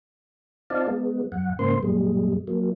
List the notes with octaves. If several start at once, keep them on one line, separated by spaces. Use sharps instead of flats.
C4 D#4 F4 D5 F5 A5
G#3 B3
F#2 F#5
G#2 C#3 A#3 C5 C6
F#2 A#2 G3 G#3
F#3 A#3